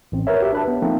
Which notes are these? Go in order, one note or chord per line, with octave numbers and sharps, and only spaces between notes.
A1 C4
A#4 B4 C#5 E5
F#4 G4 B4 E5
D4 B4 A5
B3
F3 A3 A#3 C4 D#4